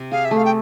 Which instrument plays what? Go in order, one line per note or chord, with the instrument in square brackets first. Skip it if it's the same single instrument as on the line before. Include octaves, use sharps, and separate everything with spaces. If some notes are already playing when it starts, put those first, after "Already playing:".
Already playing: [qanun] C3
[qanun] G#4 [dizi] F5
[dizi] E5
[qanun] A3
[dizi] F5
G5